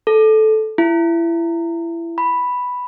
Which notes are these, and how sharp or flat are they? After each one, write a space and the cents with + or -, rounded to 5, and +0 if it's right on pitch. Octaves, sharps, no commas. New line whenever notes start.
A4 -15
E4 +25
B5 +0